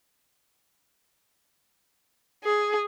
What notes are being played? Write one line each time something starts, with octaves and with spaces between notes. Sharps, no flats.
G#4